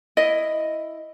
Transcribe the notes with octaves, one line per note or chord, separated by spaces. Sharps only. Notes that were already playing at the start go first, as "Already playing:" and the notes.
E4 D#5